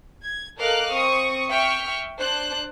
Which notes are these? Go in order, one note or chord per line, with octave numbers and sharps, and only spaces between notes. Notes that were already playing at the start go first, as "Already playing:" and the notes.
G#6
A4 A#4 D#5 F5 D6 F#6
C4 C#6 D#6
E5 G5 C#6 F6
D4 C5 F#6